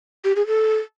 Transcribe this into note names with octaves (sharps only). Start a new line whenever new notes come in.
G4
G#4
A4